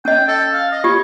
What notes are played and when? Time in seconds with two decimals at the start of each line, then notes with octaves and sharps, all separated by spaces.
0.05 C#4 D#5 G5
0.28 A4
0.52 F5
0.72 D#5
0.84 F4 G4 C#5